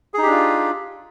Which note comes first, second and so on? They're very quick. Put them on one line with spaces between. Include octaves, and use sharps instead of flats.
G#4 D#4 G4 D4 F4